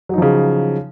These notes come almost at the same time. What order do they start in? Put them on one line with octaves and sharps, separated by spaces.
F#3 D#4 F3 C#3